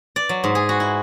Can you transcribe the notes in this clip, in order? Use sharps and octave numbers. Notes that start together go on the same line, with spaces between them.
D5
F#3
G#2
G#4
F#4
E4